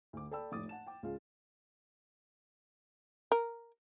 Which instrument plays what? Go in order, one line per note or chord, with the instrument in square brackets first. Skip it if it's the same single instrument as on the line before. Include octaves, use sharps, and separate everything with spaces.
[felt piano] D2 D6
A4 D5 G5 A5 B5 E6
F1 A2 D6 D#6 A6
F#5 A5 E7
G5 D6
C#2 C#3 F4 F5
[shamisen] A#4